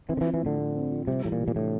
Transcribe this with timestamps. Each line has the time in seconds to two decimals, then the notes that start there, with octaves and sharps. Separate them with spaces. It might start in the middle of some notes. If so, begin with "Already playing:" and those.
0.09 E3 C4
0.17 D3
0.21 E3
0.26 F3
0.34 E3
0.42 A2 D3
0.58 A2
0.75 C4
0.91 F3
1.07 C3 G3
1.24 A2 E3
1.32 A#2
1.40 C3
1.48 A#2
1.56 A2 D4